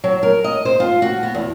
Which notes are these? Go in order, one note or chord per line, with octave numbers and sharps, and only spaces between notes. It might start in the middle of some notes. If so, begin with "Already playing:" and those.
F#3
A#4
D#5
C5
F4
F#4
B3
E2